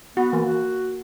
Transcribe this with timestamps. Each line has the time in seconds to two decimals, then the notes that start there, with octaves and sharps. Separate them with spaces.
0.17 B3 F#4
0.33 E3 A#3
0.46 F#4